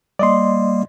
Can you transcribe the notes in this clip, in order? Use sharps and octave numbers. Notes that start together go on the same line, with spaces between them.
G3 A#3 D5 D#5 C6